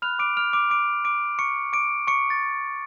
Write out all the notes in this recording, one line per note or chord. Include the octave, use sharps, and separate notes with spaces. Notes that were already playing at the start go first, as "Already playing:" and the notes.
B5 F6 F#6 F7
D6 D7
F6 F7
D6 D7
D6 D7
D6 D7
C#6 C#7
D6 D7
C#6 C#7
A6